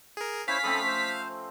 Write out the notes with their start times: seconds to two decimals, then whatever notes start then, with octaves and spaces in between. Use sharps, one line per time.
0.17 G#4 A#4
0.48 C#4 E4 C5 C#5 F5 B6
0.64 F3 A3 C4 A4 B5 D#6
0.87 C5